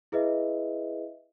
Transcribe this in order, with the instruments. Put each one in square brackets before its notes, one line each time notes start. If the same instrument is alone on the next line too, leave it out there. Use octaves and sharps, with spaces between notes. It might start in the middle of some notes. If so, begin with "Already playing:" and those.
[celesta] E4 G#4 B4 D#5 E5